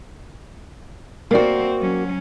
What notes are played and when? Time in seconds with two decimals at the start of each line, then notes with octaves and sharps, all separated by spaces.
1.31 A#3 C4 F#4 A#4 D5
1.80 F#3 C#4